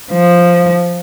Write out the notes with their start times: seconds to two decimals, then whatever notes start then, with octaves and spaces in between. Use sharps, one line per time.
0.12 F3